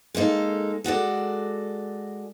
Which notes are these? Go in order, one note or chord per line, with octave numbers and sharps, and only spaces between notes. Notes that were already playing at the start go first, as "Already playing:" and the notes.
G#3 A#3 D#4 A4
G#3 F#4 A4 D5